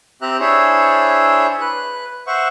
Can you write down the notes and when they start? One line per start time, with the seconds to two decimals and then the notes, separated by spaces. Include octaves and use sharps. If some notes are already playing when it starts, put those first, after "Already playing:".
0.22 C4 G4 E5 A#5 F#6
0.40 D4 E4 G#4 C5 C#5 E5
1.61 B4 F#6
2.27 C5 E5 F#5 C#6